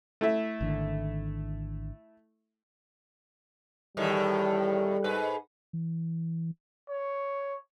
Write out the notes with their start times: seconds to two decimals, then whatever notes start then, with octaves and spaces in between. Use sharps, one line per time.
0.21 A3 E4 E5
0.61 G#1 D3 D#3
3.97 E2 A2 D#3 G3
5.04 G#2 B4
5.73 E3
6.89 C#5